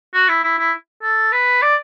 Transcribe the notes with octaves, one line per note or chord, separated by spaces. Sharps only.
F#4
E4
E4
E4
A4
B4
D5